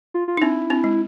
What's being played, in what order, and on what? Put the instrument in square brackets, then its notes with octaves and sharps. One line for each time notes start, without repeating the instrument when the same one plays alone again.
[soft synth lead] F4
F4
[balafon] D#4
[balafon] C4 D4 [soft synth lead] E4
[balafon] C4 D4
G#3